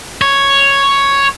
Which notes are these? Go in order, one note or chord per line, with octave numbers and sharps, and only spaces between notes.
C#5